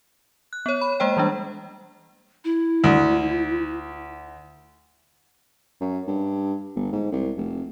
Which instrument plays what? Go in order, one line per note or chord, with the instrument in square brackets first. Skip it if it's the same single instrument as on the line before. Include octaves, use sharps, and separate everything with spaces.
[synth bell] F#6
B3 C#5
B5
G#3 A#3 C5 G5
E3 G3 G#3 D4
[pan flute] E4
[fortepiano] D2
[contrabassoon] F#2
G2
G1
G#2
C2
F1